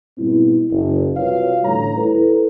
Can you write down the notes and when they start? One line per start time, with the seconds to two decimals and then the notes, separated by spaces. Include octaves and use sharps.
0.18 G#2 B2 G3 C4 E4
0.71 F#1
1.16 C2 F4 F#4 B4 C#5 F5
1.64 A1 D2 A2 G3 C#5 A#5
1.96 E4 A4 B4